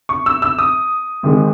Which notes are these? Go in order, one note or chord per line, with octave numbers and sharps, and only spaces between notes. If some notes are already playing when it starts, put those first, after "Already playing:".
C#6
E6
E6
D#6
G#1 G#2 D#3 G#3